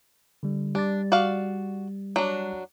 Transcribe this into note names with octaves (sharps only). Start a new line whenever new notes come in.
D3 G3
G3 D4 A6
F#4 D5 F5
F#3 D4